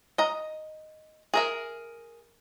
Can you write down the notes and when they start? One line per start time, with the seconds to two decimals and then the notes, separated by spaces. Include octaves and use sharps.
0.18 D#5 A#5
1.34 G#4 A#4 E5